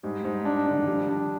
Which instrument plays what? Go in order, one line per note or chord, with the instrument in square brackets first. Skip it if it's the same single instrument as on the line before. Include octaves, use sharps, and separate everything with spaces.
[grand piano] G#2 [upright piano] G3
[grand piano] G#2
D4
[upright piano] D3 [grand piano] D4
[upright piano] D#3
[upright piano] F3 [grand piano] G3
[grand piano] D4